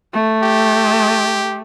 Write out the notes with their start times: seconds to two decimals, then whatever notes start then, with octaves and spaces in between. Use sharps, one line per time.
0.13 A3
0.43 G4